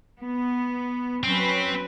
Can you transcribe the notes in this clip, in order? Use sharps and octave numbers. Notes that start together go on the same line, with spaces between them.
B3
F#3 C4 C#4 B4